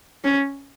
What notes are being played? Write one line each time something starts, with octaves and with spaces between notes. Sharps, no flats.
C#4